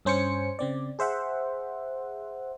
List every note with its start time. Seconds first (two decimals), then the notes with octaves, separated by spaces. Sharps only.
0.05 G2 C#4 C5 G#5 C#7
0.59 C#3 C4 D5
0.99 G#4 C5 E5 F#5